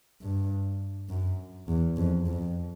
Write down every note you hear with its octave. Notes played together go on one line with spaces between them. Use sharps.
G2
F#2
E2
F2
F2